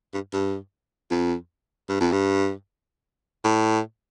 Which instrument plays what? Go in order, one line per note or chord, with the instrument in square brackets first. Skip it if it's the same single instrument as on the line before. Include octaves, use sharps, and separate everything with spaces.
[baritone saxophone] G2
G2
F2
G2
F2
G2
A2